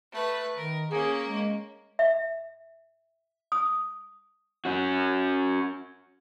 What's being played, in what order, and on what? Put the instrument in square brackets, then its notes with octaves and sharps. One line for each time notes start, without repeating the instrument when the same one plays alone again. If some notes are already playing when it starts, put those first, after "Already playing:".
[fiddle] A3 B4
[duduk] D#3 [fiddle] A#4
[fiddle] A#3 C#4 [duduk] G#4
[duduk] G#3
[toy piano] E5
D#6
[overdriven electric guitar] C#4 F#4